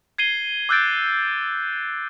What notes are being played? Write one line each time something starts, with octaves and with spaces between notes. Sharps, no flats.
G#6 C7 D#7 G7
D6 E6 F#6 G6 A6 D7